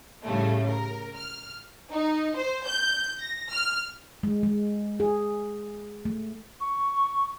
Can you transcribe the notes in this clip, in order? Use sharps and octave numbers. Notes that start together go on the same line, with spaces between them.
A2 C#3 G3 A3
A#4
F6
D#4
C5
G6
A#6
F6
G#3
G#3
G#4
A3
C#6